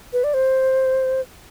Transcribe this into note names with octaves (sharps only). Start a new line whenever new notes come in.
B4
D5
C5